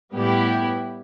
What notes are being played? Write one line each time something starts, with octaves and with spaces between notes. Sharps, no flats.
A2 G3 B3 E4 G4